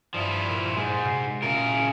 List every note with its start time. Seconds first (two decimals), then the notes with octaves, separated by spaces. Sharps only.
0.14 G2 F3 E4 D5 D#6
0.49 A#2 E7
0.76 G#2 G#3
1.03 C3 F#4 C7
1.43 A#2 C#3 A#4